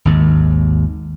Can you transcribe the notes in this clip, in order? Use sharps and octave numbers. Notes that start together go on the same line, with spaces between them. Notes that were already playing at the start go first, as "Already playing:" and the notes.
G#1 D#2